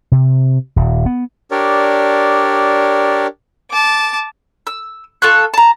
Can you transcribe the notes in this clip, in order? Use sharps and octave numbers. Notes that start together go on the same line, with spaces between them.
C3
D#1
B3
D4 G4 A#4 C#5 D5
A5 D6
E6
F4 A4 C#6 F#6
A5 A#5